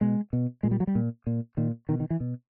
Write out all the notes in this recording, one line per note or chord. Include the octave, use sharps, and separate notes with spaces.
B2 G#3
B2
A#2 G#3
G3
F#3
G3
A#2
A#2
A#2 D#3
B2 D#3
D#3
E3
B2